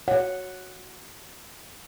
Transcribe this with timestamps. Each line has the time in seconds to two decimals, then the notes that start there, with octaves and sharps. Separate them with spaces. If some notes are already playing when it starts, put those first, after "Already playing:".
0.08 C#5 F#5